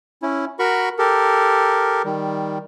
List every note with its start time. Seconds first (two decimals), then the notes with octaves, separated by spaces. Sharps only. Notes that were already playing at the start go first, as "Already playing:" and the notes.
0.22 C#4 E4
0.59 F#4 A#4 B5 C#6
0.99 G4 A4 A#4
2.05 D#3 G3